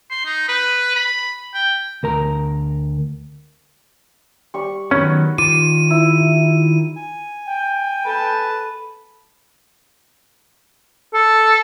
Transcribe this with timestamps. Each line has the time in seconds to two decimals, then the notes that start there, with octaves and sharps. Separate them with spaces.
0.10 C6
0.26 D#4
0.48 B4
0.96 B5
1.54 G5
2.03 D2 A#4 A#5
4.54 G3 C#6
4.91 D#3 F#3 B3 C#4 B5
5.38 D#3 F4 D6 D#7
5.90 E4
6.96 G#5
7.46 G5
8.05 A4 B4 A5
11.14 A4